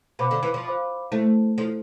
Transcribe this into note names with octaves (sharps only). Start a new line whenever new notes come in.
B2 C5 F5 B5 D6
D3
E3
F3
C5 F5 B5 D6
A3 E4 A4 C5
F3 E4 A4 C5